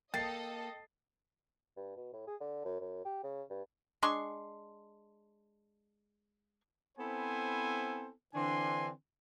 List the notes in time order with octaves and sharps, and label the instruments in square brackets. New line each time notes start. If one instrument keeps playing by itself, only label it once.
[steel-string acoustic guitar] A#3 [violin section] A4 D#5 [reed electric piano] G5 [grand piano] A6 C7
[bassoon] G2
B2
A2
G#4
D3
F#2
F#2
G4
C#3
G2
[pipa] G#3 D4 C6 C#6
[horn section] B3 C4 E4 A4 C5 G#5
D3 E3 C4 D4 G#5 C6